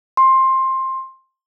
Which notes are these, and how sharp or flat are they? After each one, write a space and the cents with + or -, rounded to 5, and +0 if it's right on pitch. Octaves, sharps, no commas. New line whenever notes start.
C6 +15